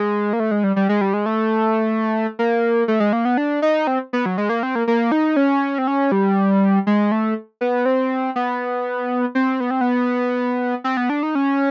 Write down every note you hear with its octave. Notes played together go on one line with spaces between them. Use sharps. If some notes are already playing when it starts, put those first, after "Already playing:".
Already playing: G#3
A#3
A3
G#3
G3
G3
G#3
G3
G#3
A3
A#3
A3
G#3
A#3
B3
D4
D#4
C4
B3
F#3
G#3
A#3
C4
A#3
A#3
D#4
C#4
C4
C#4
G3
G#3
A3
B3
C4
B3
C4
B3
C4
B3
C4
B3
D4
D#4
C#4